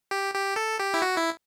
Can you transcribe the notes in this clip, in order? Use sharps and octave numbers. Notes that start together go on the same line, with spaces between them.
G4
G4
A4
G4
E4
F#4
E4